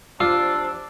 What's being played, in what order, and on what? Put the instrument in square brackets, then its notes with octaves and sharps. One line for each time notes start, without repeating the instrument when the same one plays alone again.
[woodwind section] C3 F3 D4 [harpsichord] F4 [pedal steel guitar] E6